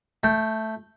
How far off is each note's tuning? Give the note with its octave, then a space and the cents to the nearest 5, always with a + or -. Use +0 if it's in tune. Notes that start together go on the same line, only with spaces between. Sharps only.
A3 +0 G5 -5